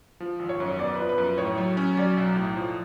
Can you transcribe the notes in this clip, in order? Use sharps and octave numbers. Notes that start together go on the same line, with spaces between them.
F3
G#1
C#5
F#2
B3 D5
B4
F3
B4
F#2
A2 C#5
F#3
C#4
F#3 D5
B1
A2
F3